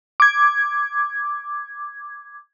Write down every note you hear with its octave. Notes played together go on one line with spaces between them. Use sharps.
D6 G#6